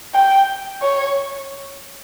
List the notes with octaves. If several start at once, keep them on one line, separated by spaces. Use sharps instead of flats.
G5
C#5